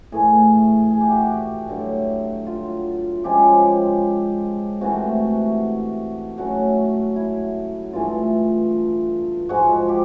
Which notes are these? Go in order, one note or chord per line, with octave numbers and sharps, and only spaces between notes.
A2 E3 A3 G#4
G#4
G4
F#4
G4
G2 D3 F#3 A3
F4
C#3 F3 G#3 G4
C3 E3 A3 F#4
C#3 F#3 A3 F#4
E4
G2 E3 A3 F4
G#2 F3 G#3 F#4
G4